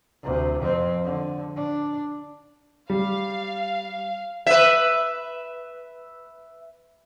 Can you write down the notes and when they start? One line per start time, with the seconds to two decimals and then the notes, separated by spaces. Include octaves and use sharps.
0.23 D2 C3
0.61 F2 C4
1.04 D3
1.56 D4
2.90 G3 F5
4.47 B4 E5